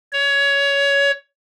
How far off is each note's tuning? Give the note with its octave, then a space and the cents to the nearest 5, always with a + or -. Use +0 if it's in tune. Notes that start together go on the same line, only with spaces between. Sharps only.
C#5 +20